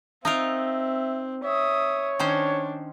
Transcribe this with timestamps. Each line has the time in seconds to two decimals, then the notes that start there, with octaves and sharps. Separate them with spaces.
0.25 C4 D#4 F4 A#4 E5
1.43 C#5 E5 D#6
2.19 D#3 C#4 D4 C5